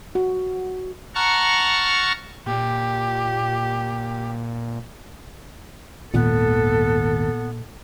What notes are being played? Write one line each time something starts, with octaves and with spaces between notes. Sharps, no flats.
F#4
F#5 A5 A#5 C#6 F6
A#2 G4
G#1 D#2 A#2 B3 A4